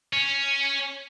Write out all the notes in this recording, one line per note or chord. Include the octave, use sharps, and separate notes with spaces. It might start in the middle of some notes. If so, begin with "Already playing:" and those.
C#4